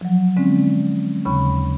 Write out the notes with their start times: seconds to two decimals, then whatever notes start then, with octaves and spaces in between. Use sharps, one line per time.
0.01 F3 F#3
0.37 D3 G#3 C4 C#4
1.25 D#2 C#3 B5 C#6